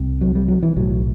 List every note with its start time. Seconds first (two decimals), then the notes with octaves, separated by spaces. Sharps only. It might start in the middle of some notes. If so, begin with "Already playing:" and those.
Already playing: C2 C3
0.21 F#3
0.35 G3
0.48 F#3
0.63 E3
0.77 B1 A2 F#3